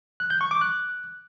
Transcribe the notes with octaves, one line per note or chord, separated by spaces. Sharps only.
F#6
G6
C#6
D6
F#6